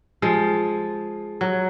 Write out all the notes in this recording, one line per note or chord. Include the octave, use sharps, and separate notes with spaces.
F3 G#3
F#3